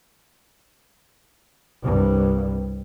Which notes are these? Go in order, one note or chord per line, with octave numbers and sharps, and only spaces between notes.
C2 G2